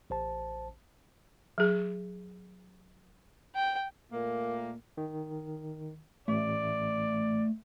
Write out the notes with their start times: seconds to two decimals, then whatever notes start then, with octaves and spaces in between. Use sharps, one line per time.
0.10 A1 C5 A5
1.58 F#3 G#4
3.55 G5
4.12 A#2 A3 A#3
4.97 D#3
6.28 A1 A3 D5